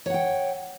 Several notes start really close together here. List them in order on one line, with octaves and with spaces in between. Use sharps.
C#5 F#5 G5